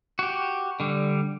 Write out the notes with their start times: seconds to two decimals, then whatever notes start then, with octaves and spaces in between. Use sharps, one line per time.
0.19 F#4 G4
0.80 D3 G3